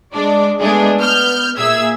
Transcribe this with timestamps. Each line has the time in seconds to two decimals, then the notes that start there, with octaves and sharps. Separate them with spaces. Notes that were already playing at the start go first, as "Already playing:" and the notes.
0.13 G#3 D4 D5
0.60 G#3 A3 B3 D4 G#4
1.00 B3 F6 G6
1.58 A#2 G#4 E5 E6 G#6